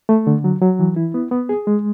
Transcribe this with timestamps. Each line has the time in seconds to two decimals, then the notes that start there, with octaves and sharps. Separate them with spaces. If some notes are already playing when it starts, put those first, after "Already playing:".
0.09 A3
0.27 D3
0.44 F#3
0.61 F#3
0.79 E3
0.96 E4
1.14 B3
1.31 B3
1.49 G#4
1.67 G#3